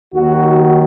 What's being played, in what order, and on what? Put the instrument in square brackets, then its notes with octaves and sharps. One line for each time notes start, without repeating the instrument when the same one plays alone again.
[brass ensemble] D#2 D#3 F#3 F#4